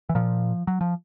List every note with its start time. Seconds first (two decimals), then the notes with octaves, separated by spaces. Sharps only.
0.09 E3
0.15 A#2 F3
0.67 F#3
0.81 F3